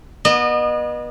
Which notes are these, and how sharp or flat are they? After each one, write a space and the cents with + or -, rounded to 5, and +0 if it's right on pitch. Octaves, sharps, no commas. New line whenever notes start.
B3 -30 D#5 -30